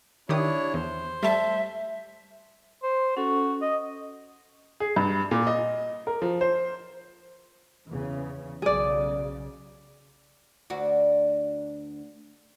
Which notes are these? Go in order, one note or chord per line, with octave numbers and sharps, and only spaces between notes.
D#3 D4 E4 G4 C#5 D#6
E2 C5
G3 A3 E5 A5
C5
C#4 F#4 A4
D#5
G#4
G2
A#2
D#5
A#4
F3
C5
E2 C#3 E3
B1 C#3 F#3 G#4 D5
D2 D4 F#4